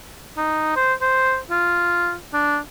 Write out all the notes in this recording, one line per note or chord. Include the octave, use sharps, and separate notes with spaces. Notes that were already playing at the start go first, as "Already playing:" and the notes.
D#4
C5
C5
F4
D4